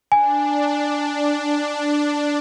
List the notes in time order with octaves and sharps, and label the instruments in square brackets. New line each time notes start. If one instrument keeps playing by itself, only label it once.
[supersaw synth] D4 [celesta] G#5